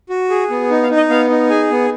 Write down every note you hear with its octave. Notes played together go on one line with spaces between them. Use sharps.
F#4
G#4
B3
D#4
F5
D#4
D#5
B3 F5
D#4
G#4 G#5
B3